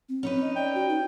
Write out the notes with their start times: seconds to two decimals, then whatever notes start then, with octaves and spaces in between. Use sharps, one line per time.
0.09 C4
0.23 C#4 D#4 B4
0.41 D#5
0.56 D5 G5
0.75 F#4
0.89 D#4